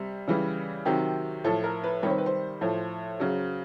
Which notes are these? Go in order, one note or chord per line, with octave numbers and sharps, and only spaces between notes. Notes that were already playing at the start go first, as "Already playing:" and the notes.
Already playing: C3 G3
C#3 E3 G3
C3 D#3 F#3 G4
A2 F3 A4
A#4
B4
C3 D#3 G3 C#5
C5
B4
C5
A2 F3
C#3 F#3